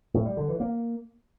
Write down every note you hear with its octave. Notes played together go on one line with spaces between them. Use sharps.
A2
G3
D3
E3
A#3